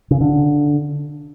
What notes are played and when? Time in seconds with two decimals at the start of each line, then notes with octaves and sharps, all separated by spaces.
0.11 C#3
0.21 D3